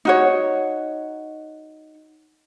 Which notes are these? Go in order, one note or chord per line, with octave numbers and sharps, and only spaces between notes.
D#4 F#4 C#5